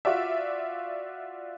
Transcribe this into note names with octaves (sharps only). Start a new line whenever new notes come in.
F4 F#4 D5 E5